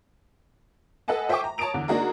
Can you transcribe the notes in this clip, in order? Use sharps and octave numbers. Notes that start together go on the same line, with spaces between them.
A4 B4 D#5 F#5 G#5 A5
C5 E5 G5 G#5 C#6 D6
A#5
C#5 A5 A#5 D#6 D7 F7
E2 D3
A#3 D4 D#4 F#4 G#4 A#4